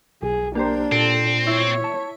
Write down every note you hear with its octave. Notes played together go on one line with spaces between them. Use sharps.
B1 G#4
A#3 D4 G4 C5
A#2 C4 F4 A4
E4 C#5
A5